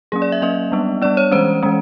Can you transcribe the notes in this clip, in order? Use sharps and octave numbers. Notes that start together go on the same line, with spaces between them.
F#3 A#3 C#4 G#4
D5
E5
F#3 A#3 C#4 D#5
G3 B3 D4
G3 B3 D4 D5
C#5
E3 G#3 C#4 C5
E3 G#3 C#4